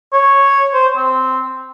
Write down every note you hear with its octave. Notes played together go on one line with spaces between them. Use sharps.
C#5
C5
C4